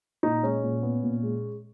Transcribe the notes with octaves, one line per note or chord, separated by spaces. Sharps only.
A#2 D#4
G#3 C#4
A#2
B3
A#2
G#3